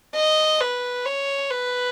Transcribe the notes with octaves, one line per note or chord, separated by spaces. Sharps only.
D#5
B4
C#5
B4